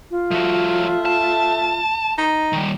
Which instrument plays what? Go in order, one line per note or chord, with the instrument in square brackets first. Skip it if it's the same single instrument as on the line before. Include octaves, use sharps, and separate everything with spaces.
[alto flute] F4
[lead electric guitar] F3 F#4 [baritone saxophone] A3
[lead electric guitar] A5
[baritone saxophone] D#4
[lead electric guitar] D#3 G3